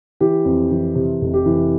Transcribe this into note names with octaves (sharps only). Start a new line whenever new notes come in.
E3 G4
F2
E3
C3
F1
G4
E3